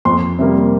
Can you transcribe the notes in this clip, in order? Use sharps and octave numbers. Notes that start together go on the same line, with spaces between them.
F2 C6
C3 G3 A#3